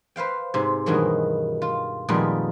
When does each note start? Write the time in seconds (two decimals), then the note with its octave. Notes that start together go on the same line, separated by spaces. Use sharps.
0.16 B4 C5 F5 G5
0.54 G#2 C3
0.86 G2 B2 D#3 E3 F#3 G#3
1.62 F4
2.09 F2 A#2 D#3 G3 G#3 B3